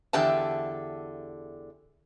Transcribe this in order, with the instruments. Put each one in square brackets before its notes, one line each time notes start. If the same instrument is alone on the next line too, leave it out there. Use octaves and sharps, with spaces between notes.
[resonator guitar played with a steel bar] E2 D3 G4 E5 A5